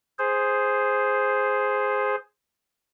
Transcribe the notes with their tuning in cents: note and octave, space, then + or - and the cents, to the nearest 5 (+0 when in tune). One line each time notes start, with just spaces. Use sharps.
G#4 +0 C5 +0